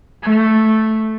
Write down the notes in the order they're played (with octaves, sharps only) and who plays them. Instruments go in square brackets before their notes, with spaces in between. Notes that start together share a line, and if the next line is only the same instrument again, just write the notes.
[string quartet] A3